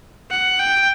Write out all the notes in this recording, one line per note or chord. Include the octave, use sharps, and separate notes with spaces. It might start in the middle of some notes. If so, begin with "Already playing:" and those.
F#5
G5